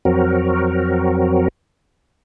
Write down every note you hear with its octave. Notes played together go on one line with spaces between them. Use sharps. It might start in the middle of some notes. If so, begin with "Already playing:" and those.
F2 F#3 C4 F#4 A#4